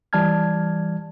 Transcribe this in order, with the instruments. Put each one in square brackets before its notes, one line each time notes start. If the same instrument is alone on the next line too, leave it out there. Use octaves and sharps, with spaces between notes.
[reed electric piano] E3 G3 D5 A5 F6 G#6